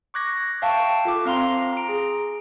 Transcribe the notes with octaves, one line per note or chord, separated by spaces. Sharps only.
C#6 D6 F#6 G#6 A#6
E5 F5 G5 A5 C#6
F4 A4 D6
C4 F5 A#5 C6
A#5 D7
G#4